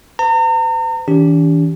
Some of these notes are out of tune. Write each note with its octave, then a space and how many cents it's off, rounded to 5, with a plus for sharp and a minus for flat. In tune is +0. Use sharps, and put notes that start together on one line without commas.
B4 +45 A#5 -40
E3 -35 D4 -45 G4 +0